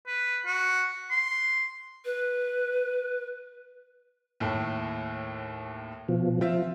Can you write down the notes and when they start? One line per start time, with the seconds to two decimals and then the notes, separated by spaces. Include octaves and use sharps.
0.07 B4
0.46 F#4
1.11 C6
2.05 B4
4.40 D#2 A2
6.08 B2 F3
6.41 F3 C4 F4 E5